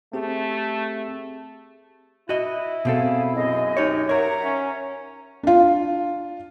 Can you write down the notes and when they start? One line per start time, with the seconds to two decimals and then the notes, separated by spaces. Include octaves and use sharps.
0.13 A3 C4 G4 G#4
2.29 E4 F#4 D#5
2.85 B2 C4 G#4 A4 F5
3.35 F#2 G#4 D#5
3.77 D#4 G4 C#5
4.09 A#4 C#5 E5 F#5 A#5
4.44 C#4
5.43 D4 F4